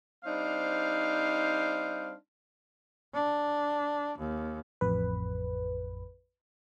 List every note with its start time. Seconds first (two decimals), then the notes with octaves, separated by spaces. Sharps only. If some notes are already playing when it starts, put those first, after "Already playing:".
0.25 G3 C4 D4 D#4 C5 F5
3.14 D4
4.18 D#2
4.81 A1 F2 B4